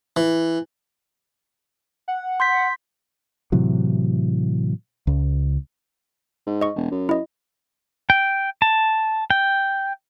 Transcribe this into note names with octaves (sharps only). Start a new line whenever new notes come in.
E3
F#5
C6 G6 B6
A2 C3 E3 F#3
C#2
G#2
D#5 C#6
E1
F#2
E4 D#5
G5
A5
G5